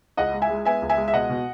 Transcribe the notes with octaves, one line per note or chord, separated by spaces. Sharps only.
C#2 D#5 F#5
G#3
E5 G#5
G#3
B3 E5 G#5
C#2
E5 G#5
G#3
E5
B2 D#5 F#5
B2